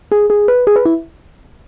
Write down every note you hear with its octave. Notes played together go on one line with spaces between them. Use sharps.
G#4
G#4
B4
G#4
B4
E4